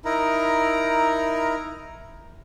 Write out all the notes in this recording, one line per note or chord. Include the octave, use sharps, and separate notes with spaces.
D#4 E4 A#4 A#5